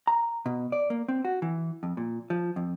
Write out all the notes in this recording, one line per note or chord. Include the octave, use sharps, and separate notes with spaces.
A#5
B2
D5
A#3
C4
F#4
E3
F2
A#2
F3
F2